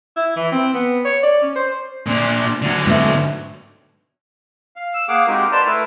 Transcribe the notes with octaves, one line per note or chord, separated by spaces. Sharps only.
E4
E3
C4
B3
C#5
D5
C#4
C5
A#2 D4
D3 F#3
G#2 B2 A3
F5
E6
A#3 G#4 F5 F#5 D6
G#3 C4 D#4 F#4 G4 A#4
B4 C5 D5 A5 A#5 C6
A3 E4 A#4 B4